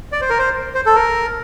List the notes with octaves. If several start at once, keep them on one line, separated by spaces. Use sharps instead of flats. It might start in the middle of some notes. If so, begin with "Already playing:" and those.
D5
C5
A#4
C5
C5
A4
A#4